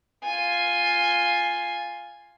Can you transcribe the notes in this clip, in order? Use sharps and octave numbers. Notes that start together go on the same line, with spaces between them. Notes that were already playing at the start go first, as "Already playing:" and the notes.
F4 G#5